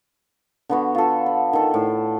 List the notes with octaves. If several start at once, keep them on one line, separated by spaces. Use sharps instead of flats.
D3 B3 F#4
F4 A4
B5
D#3 A4
A2